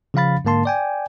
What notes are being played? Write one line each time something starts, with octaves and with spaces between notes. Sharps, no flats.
C#3 F3 C#4 F5 B5 A6
G#2 D3 A#3 A5 C6
D5 G5 G#5